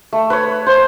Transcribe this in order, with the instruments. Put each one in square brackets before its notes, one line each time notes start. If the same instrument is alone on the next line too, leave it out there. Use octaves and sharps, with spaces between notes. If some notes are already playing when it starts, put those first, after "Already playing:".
[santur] A3
B4 C#5
C5